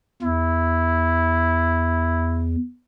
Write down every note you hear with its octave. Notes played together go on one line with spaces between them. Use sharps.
E2 E4